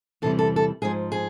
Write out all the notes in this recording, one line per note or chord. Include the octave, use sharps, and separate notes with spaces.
E2 C3 E3 G3 A4
A4
A4
G#2 F3 G#4
G#4